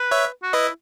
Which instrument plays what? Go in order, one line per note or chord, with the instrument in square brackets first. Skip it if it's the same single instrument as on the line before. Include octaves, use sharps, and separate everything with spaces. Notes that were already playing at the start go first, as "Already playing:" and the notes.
Already playing: [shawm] B4
[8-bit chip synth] C#5 E5
[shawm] F#4
[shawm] E4 [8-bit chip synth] B4 D#5